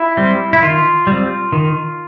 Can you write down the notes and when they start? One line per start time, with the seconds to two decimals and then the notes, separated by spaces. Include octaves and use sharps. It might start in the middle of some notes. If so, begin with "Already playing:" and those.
Already playing: E4
0.17 G3 C4
0.53 E4
0.62 D#3 F4
1.07 G3 C4
1.52 D#3